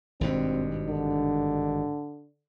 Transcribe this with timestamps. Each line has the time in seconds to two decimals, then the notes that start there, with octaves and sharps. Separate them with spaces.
0.21 G#1 G2 B2 C4
0.88 D3